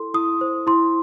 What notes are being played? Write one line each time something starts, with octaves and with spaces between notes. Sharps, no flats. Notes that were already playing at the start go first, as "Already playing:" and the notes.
Already playing: E4 A4 C6
E4 D#6
C5
E4 C6